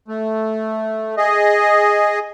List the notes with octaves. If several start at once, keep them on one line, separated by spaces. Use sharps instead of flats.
A3
G#4 D#5